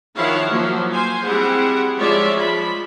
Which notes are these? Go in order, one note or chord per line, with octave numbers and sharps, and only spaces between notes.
D#3 F3 E4 C#5 F5 F#5
F3 F#3 A#3
C5 F5 G#5
G3 C4 E4 G4 G#4 F#5
F3 G#3 F4 C#5 D5 E5
F3 B5